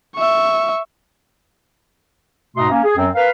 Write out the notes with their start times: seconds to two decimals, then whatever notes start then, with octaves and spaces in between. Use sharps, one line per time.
0.16 E5 C#6
2.57 G#2 B2 A3 A#5 C6 D#6
2.71 A#3 C#4
2.84 G#4
2.97 F#2 F#3 C4
3.14 A#4 B4 F5